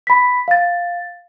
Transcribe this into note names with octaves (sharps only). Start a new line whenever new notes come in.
B5 B6
F5 A6